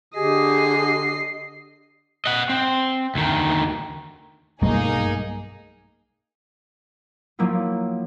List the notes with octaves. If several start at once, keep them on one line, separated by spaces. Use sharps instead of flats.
D3 G4 G#4 D#5 C7
D#5 F#5
C4
D2 D#3
B1 G2 A3 A#3 D#4 G#4
F3 F#3 A#3 E4 F4